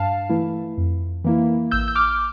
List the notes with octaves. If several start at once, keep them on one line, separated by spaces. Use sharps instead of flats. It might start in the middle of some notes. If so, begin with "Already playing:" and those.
Already playing: G2 F5 A5
E3 A3 E4
F2
E3 A#3 E4
A1 E6 G6
G6
D6 F6